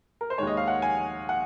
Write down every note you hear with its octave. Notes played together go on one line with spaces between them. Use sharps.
A#4
C5
D#2 D#3 G#3 C#5
D#5
F5
F#5
G#5
F#5